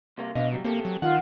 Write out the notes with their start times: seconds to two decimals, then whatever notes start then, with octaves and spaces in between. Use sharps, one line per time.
0.18 C2 C3 A#3
0.35 B2 D4 D#5 F5
0.53 F#3 G3
0.64 A#3 C4 G4 A4
0.85 F#3
1.02 D#3 F4 F#5